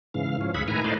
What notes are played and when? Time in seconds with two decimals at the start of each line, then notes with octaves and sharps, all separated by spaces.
0.14 G#2 C#3 E3 F5
0.41 F3 C#4
0.54 D2 G#2 G#4 E5 F#5 B5
0.68 A2 D#3 E4 B4 G#5 A#5
0.84 A3 D#4 C5 D5 D#5 F5